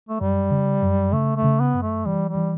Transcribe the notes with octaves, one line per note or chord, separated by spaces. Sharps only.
A3
F#2 G3
C#3
F#2
C#3 A3
A3
C#3
B3
F#2
A3
E3 G3
G3
E3